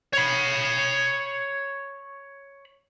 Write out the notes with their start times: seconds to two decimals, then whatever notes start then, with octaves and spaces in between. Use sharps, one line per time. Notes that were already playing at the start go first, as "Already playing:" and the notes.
0.13 C#5 B5